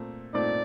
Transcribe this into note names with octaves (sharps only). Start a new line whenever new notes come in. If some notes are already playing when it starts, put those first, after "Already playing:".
Already playing: A#2 A3 C4
A#2 A3 C4 D#4 D5